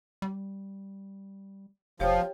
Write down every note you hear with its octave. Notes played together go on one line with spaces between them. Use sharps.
G3
F1 F3 G4 C#5 F5 G5